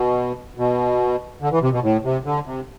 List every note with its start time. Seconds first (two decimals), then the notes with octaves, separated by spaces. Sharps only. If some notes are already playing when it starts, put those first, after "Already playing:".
Already playing: B2
0.58 B2
1.42 D3
1.52 E3
1.62 C3
1.72 B2
1.83 A2
2.04 C3
2.25 D3
2.46 C3